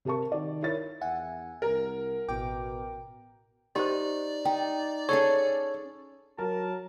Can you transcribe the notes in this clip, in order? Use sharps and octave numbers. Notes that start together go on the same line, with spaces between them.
C3 G4 A#4 A5 C#6
D#3 D5
E4 A#4 C#5 A6
E2 E5 F#5 G#5
C2 A#4
A1 B2 G5 D6
D#4 G4 C5 D5
D#4 G5
C#4 G#4 A4 C#5
F#3 F#4 A#4 A5